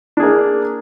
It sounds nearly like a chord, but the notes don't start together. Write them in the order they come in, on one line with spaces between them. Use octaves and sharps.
D4 G#4 A#3